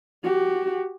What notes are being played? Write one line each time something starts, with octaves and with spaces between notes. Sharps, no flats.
F#4 G4